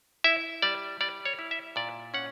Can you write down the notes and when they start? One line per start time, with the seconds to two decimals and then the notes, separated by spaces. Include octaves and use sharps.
0.24 E4 E5
0.62 G3 D5
1.01 G3 D5
1.25 C#5
1.39 E4
1.51 E5
1.76 A#2 D5
2.14 C#4 F#5